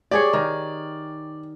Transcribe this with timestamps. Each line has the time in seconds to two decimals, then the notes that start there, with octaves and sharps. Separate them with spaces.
0.11 G4 G#4 C#5 D5
0.33 D#3